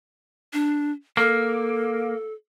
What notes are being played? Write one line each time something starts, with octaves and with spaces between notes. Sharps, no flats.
D4
A#3 A4